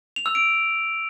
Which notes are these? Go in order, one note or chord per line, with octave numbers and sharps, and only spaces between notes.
F7
E6
D7